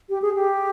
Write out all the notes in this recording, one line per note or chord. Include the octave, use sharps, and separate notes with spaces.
G4
G#4
G4